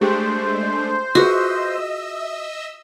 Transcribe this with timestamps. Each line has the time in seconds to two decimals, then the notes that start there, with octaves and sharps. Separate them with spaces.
0.01 G#3 A3 D4 G4 G#4 C5 G5
1.15 F4 F#4 G#4 B4 D#5 E5 E6